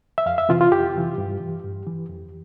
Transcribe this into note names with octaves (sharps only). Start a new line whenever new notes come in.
E5
F2 F5
E5
C3 E3 F4
F4
F2 G4
C3 E3
G2
E3
G2
E3
F2